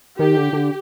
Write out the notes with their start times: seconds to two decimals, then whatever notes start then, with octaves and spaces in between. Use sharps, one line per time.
0.19 D#3 G4
0.36 D3
0.53 D3